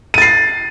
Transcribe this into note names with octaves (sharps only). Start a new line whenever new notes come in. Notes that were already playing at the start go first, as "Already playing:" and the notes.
A6 C7 D#7